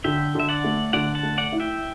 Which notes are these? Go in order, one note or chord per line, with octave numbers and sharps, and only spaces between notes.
D3 E5 G5
D3 E5
D5 F#5
A3
D3 D5 F#5
F#5 A5
A3
D5 F#5
E4
E5 G5